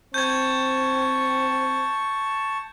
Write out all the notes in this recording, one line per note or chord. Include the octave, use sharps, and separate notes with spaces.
C4 A5 C#6 G6 G#6